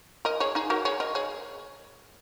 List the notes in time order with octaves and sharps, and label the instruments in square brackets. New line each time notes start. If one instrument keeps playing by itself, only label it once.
[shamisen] A#4 D#5
G#4 C#5
D#4 G#4
F#4 A#4
G#4 C#5
A#4 D#5
G#4 C#5